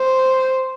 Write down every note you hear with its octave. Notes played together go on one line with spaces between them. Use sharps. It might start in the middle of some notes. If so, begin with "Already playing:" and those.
Already playing: C5